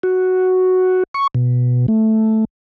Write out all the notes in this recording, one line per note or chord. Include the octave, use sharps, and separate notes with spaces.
F#4
C#6
B2
A3